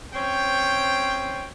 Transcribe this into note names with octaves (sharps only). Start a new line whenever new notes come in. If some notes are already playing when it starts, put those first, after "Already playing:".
C4 C#4 C5 C#5 G5